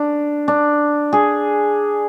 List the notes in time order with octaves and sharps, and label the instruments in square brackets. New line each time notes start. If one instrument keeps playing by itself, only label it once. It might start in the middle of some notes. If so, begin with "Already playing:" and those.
Already playing: [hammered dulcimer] D4
D4
G#4